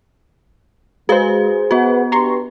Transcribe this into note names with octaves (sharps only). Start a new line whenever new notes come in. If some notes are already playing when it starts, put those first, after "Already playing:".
G#3 F#4 G#4 B4 C5 F5
B3 F#4 B4 F#5
D4 G4 B4 A#5 C6 C#6